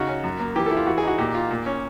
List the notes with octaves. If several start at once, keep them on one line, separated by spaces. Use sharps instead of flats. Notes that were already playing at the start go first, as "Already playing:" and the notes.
Already playing: C#3 D#4 F#4
C#4
F#2
A#3
E3 G4
A4
E4
F4
E3 F#4
G#4
D#4 F#4
A#2 G4
F4
A#2
C#4